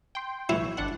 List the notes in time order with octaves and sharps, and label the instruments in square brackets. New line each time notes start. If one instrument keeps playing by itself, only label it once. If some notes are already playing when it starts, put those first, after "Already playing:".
[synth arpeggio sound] G5 C6
[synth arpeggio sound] B1 E3 C#5 [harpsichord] E4
[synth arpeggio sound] G1 D4 F#5